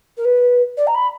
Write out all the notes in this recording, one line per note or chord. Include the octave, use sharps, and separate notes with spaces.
A#4
B4
D5
A#5
B5